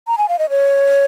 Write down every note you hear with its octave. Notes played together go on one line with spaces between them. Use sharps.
A#5
G#5
F5
D#5
C#5